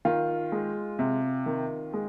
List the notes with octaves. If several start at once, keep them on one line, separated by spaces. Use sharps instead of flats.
D#3 F4
G#3
C3
D#3
G#3